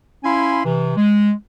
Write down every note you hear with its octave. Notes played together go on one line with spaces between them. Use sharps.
C#4 E4 F5 G#5 B5 C6
C3 E3
G#3